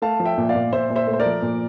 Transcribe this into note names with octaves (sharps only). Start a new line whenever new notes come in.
A3 F5 A5
F3
E5 G5
A#2
D5 F5
A#2
A#2 C5 E5
A#2
C5 E5
A3
C5
A#4 D5
F3
A#2